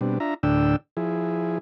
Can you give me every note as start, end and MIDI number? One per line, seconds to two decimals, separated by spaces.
0.01 0.19 47
0.01 0.19 55
0.01 0.19 60
0.01 0.19 62
0.20 0.34 62
0.20 0.34 65
0.20 0.34 76
0.20 0.34 82
0.43 0.76 38
0.43 0.76 45
0.43 0.76 50
0.43 0.76 62
0.43 0.76 79
0.43 0.76 88
0.97 1.58 53
0.97 1.58 64
0.97 1.58 68